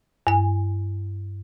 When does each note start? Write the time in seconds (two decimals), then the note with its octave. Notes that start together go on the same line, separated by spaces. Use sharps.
0.27 G2 G#5